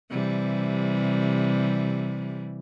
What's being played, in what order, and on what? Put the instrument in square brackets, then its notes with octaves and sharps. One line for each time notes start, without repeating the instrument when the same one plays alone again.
[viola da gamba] C3 E3 G3